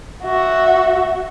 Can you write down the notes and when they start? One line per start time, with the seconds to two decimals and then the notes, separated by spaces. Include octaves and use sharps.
0.24 F#4 E5